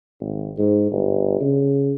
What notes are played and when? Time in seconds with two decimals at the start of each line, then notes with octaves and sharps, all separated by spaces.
0.21 G#1
0.58 G#2
0.91 G1
1.41 C#3